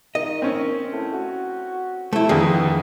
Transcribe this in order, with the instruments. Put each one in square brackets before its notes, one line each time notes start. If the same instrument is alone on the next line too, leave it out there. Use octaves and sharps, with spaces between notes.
[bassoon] D#3 [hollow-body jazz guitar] D#5
[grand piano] C4 C#4
[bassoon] A2
F#4
[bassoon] C3 [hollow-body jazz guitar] A3 E4
[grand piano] F2 D3 G#4 [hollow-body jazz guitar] D#3 [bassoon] B3